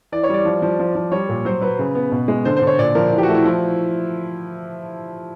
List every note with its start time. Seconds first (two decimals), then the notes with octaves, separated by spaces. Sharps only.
0.12 E3 D5
0.24 C#5
0.29 G3 D5
0.45 F3
0.62 F3
0.79 F3
0.95 F3
1.12 G3 C#5
1.29 A#2
1.45 F#3 C5
1.61 F#3 B4
1.79 C#3
1.95 B3
2.12 B2
2.28 G#3
2.45 D3 C5
2.57 C5
2.62 D3
2.67 C#5
2.78 A#2 D5
2.95 F3 A#4
3.12 E3
3.18 G4
3.23 A3 F#4
3.34 E4
3.44 F3 E4